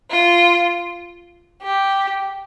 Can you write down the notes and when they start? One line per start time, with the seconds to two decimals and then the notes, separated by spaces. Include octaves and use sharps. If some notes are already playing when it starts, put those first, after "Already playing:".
0.11 F4
1.62 G4